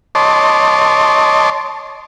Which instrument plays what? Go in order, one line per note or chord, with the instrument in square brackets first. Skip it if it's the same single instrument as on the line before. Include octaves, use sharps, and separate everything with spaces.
[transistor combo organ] C#5 D#5 A5 C6 D6